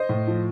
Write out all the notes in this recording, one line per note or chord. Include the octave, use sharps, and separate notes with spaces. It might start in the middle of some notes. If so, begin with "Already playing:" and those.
Already playing: C5 D#5
A2
F3